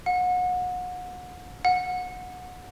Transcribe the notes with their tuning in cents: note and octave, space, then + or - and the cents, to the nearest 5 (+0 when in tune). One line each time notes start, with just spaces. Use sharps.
F#5 -30
F#5 -20